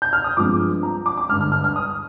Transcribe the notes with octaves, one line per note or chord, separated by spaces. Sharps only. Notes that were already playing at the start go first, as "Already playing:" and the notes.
G6
F6
D#6
G2 F3 G#3 C4 D6
A#5
D6
D6
G2 D3 G#3 F6
F6
F6
F6
D#6